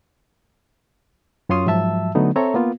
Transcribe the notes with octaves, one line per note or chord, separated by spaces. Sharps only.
F#2 C#4 F4 C#5 C6 D#6
G#2 F3 F#3 E5 A5 E6
D3 F#3 A3 B3 D#4
C4 A4 C#5 E5 A#5
A#3 B3 F4